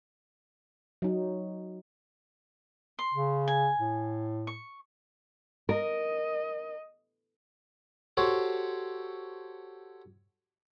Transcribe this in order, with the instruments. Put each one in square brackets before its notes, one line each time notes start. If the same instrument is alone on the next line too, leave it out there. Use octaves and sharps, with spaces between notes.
[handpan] F#3 D#4
[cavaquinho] C6
[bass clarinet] C#3
[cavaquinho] G#5
[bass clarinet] A2
[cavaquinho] C#6
[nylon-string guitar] A#4 [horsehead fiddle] D#5
[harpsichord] F#4 G4 A4 C5 C#5